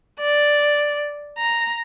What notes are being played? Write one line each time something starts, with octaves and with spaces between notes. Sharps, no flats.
D5
A#5